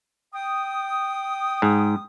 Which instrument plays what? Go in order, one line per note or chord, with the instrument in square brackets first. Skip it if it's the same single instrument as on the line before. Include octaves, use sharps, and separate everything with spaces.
[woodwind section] G5 D#6
[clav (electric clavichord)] G#2